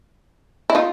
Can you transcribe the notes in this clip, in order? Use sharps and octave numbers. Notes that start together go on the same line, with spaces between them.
E4
D#4 F4